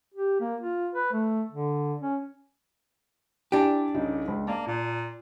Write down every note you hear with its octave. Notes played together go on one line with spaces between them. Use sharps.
G4
A#3
F4
B4
A3
D3
C#4
D4 E4 G4 G#5
C2 C#3 D#4
C#2
A#3 D5 A5
A#2